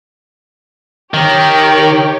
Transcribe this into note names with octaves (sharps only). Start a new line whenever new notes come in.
D#3 G4 A#4 C#5